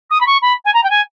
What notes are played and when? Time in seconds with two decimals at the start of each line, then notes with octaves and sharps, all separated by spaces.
0.10 D#6
0.20 B5
0.26 C#6
0.42 B5
0.65 G#5
0.73 A#5
0.83 G5
0.90 G#5